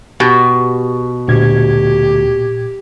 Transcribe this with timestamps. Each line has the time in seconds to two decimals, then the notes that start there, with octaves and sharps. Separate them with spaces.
0.20 B2 G4
1.28 D2 A#2 G4 G#6